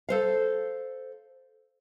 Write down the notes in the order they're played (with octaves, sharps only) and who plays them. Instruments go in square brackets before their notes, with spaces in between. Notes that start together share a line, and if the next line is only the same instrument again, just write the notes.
[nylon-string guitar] A4 C5 F5